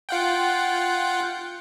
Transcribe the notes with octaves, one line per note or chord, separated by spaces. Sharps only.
F4 F#5 G5